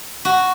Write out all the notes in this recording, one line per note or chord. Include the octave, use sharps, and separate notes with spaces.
F#4